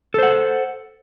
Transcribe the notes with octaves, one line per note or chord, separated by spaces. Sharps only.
A4 C5 F#5